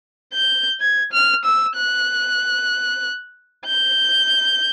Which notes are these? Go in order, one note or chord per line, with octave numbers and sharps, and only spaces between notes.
G6
G#6
F6
E6
F#6
G6